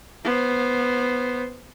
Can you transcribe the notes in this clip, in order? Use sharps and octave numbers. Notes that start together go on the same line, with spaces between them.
B3 C5